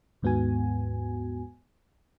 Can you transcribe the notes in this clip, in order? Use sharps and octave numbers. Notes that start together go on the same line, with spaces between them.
D#2 G#2 B3 F#4 G#5